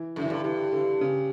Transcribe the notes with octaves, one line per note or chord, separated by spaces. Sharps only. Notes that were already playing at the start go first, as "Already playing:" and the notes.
Already playing: E3
F#2 D3
E3
G2 D3
G2 E3
D3
C#3